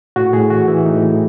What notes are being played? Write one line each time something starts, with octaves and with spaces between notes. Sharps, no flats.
A2 F#4
A2 G#4
E3 F#4
E3 E4
A2 D#4
A2